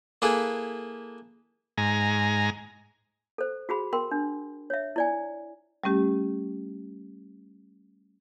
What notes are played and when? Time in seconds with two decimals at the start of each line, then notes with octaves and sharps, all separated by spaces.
0.22 A#3 E4 G#4 A4 B4
1.78 G#2 G#5 A#5
3.38 A4 C5
3.69 F#4 G#4 B5
3.93 A#4 G5 C6
4.11 D4
4.70 C#5 E5
4.96 E4 D5 G#5
5.84 G3 A3 C#4 G4